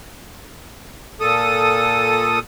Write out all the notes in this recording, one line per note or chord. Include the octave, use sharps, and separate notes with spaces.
A#2 A4 D#6